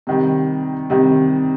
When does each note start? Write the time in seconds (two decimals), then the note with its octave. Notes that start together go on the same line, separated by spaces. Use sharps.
0.07 C3 D#3 G3
0.90 C3 D#3 G3